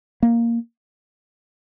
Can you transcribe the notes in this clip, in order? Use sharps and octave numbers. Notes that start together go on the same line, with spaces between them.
A#3